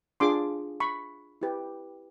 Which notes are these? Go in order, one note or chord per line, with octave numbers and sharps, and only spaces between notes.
D4 F4 G#4 C6 D6
B5 C#6
E4 G4 B4